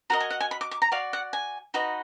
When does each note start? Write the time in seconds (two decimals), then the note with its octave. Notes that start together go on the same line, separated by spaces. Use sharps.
0.10 F#4 A#4 D#5 A#5
0.20 G#5
0.30 F#5
0.40 G#5
0.51 B5
0.61 D6
0.71 D6
0.82 A#5
0.92 F#4 D5 F5
1.13 F#5
1.33 G#5
1.74 D#4 F#4 B4 D#5